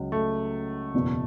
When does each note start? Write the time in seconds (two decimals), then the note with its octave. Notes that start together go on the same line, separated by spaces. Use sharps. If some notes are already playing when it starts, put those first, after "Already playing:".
Already playing: C#2 F#3
0.12 A3
0.94 F#1 E2 B2